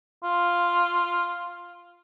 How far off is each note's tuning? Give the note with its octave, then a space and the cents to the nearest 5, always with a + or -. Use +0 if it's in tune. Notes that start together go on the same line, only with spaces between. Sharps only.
F4 +0